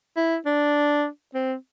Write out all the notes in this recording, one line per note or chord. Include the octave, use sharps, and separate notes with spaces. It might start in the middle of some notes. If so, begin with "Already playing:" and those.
E4
D4
C4